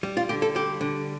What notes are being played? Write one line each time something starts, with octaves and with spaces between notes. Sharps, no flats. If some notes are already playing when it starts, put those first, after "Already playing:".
G3
F4
D3 G4
A4
G3 G4
D3